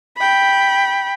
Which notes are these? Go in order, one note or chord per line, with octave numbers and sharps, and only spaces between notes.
G5 B5